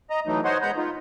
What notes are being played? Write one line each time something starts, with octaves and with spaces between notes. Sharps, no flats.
D#5 A#5
E3 F#3 A3 D#4
C5 C#5 D#5 F#5 C6
G#3 B3 F#5 A#5 B5 G6
D#4 F4